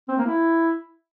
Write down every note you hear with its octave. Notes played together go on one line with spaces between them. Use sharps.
C4
A#3
E4